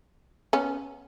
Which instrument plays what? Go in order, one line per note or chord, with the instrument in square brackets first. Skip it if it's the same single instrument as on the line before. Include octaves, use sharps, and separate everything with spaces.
[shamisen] B3 C#4